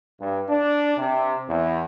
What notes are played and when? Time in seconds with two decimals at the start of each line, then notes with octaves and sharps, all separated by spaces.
0.21 G2
0.49 D4
0.96 C3
1.48 E2